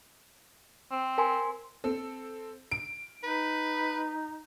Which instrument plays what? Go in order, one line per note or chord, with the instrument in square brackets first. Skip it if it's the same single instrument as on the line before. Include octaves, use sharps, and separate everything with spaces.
[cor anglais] C4
[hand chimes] A#4 G#5 C6
[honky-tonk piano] C4 A4
D7
[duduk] D#4 [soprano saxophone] B4